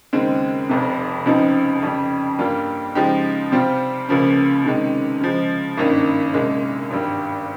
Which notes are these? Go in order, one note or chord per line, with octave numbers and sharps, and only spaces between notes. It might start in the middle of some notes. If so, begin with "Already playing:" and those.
D#2 C#3 G#3 C4
F1 F2 C3
C#2 C#3 F3 C4 D#4
F2 C#3 G3
G2 G3 A#3 F4
C#3 F3 G#3 D#4 G4
C3 G3 C4 F4
C#2 C#3 F3 A#3 C#4
C3 D#3 G#3 C#4
C#3 F3 G#3
G#1 G2 D#3 A#3 C#4
C2 A#2 G#3 C#4
G#1 G2 G3